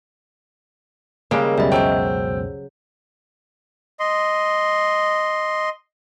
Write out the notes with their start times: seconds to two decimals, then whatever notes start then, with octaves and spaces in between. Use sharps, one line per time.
1.31 C#3 G3 G#3 A#3 A#4
1.58 C#2 F#2 B2 G3 D#5 E5
1.72 F#3 C5 G5 E6 G6
4.00 D#5 C6